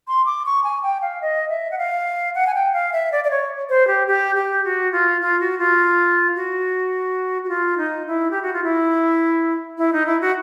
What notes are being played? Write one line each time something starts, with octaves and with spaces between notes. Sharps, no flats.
C6
D6
C#6
G#5
G5
F5
D#5
E5
F#5
F5
F#5
G#5
G5
F5
E5
D5
D5
C#5
C5
G4
G4
G4
F#4
F4
F4
F#4
F4
F#4
F#4
F4
D#4
E4
G4
F#4
F4
E4
E4
D#4
E4
F#4